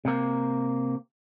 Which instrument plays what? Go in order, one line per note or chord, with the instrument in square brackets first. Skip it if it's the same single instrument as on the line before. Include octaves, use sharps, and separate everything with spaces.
[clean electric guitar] C3 A#3